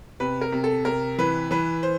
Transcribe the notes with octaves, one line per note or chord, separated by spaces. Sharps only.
C3 B4
A#4
C3
A4
C3 A#4
E3 B4
E3 B4
C5